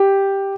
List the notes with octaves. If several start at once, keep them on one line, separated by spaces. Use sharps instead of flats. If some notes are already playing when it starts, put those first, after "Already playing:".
Already playing: G4